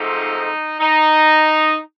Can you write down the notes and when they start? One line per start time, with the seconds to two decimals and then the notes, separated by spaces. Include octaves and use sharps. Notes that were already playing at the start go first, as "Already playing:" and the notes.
Already playing: G#2 F3 A3 C4 D#4
0.80 D#4